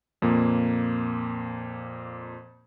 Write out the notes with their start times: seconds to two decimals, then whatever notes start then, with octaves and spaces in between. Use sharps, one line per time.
0.22 F2 A#2 A#3